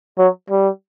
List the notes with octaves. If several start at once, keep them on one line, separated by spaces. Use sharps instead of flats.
F#3
G3